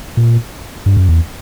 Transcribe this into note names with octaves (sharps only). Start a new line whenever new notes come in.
A#2
G2
F#2
E2